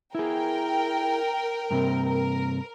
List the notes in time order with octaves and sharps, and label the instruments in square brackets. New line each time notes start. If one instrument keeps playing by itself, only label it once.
[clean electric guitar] E4 G#4 [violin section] A#4 G5
[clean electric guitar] G2 C3 C4
[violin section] A#4